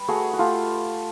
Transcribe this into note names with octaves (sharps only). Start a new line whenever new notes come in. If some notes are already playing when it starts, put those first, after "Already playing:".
Already playing: G3 B4
A3 F#4 G#4
F#4
A3 F4 G4